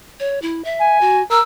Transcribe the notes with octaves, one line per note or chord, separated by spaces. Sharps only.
C#5
E4
E5
G#5
F#4
A#4 E6